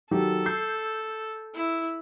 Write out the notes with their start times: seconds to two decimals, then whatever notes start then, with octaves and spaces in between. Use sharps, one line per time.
0.11 D#3 F#3 G4 A4
0.46 E6 G6 C7
1.55 E4